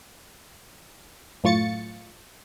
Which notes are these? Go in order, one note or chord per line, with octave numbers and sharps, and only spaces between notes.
F#2 A2 F4 C#6 A6 C#7